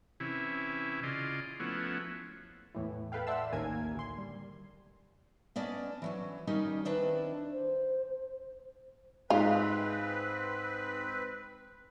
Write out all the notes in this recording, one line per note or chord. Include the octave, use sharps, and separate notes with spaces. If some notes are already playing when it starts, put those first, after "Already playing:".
C3 E3 C#4 E4
C#3 F4 D5 D#5 C6
F3 A3 B3 C#4 E4 F#4
E2 A2 E3
A4 B4 E5 F5 G5
D5 E5 F#5 A5 C6 E6
A1 D#2 A#3 A#4 G#5 G#6
D2 C6
G3
B3 C#4 D5 D#5 A5
E3 F#3 C#4
D#3 G3 C#4 D#4 A#4
D#3 C4 D4 E4 B4 A5
C5
G#2 G#3 C4 F4 B4